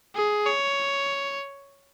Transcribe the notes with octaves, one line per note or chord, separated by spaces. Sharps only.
G#4
C#5